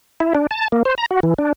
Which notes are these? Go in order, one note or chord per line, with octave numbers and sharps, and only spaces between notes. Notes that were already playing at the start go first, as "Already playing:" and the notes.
E4
D4
A5
A#3
C5
A#5
F#4
E3
D4